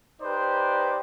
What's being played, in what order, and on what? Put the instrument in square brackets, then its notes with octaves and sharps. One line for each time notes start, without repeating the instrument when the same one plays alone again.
[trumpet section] D#4 G4 B4 C5 D5